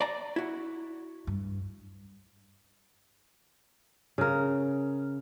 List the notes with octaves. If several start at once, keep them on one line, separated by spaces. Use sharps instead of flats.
D5 A#5
E4 F#4
G2
C#3 A#4